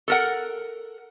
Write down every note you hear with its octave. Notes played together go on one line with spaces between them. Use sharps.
A4 A#4 F#5